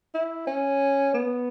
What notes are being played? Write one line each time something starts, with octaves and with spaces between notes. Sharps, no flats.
E4
C#4
B3